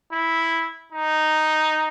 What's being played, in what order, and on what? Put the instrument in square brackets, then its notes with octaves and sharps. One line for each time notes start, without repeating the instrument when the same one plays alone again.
[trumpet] E4
D#4